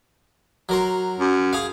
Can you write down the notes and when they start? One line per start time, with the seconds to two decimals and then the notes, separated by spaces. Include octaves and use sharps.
0.69 F#3 A#4 C6
1.20 F#2
1.53 G#4 F5